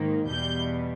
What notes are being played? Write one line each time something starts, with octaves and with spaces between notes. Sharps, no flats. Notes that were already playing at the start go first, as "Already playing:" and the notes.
Already playing: G#2 D#3 A#3
E2 B2 G3 G6